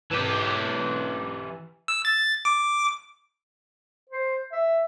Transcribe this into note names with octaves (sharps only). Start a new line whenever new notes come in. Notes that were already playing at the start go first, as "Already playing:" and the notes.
E3 G4
E6
A6
D6
C5
E5